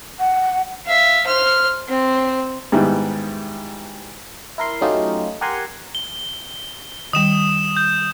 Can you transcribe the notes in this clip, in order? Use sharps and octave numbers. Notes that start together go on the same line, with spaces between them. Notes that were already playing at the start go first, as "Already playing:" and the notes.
F#5
E5 F5
C5 F6
C4
G#2 D#3 G3 B3 E4
E4 A#4 C6
F#3 A3 C#4 D#4 F4 G4
G4 A#4 F#5 G#5 A#5 C6
G7
D#3 G3 D#6 E7
G6